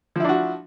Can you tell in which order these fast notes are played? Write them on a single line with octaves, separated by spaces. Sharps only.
F3 E4 D4 F#4